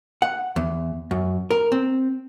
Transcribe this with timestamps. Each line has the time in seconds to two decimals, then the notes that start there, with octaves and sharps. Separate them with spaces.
0.22 F#5
0.56 E2
1.11 F#2
1.51 A#4
1.72 C4